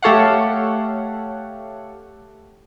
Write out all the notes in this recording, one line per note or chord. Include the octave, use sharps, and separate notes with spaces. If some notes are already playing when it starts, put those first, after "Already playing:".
A3 G4 A4 C#5 F5 F#5